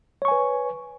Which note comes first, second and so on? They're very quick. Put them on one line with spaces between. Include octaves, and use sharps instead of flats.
C#5 C#6 G#5 B4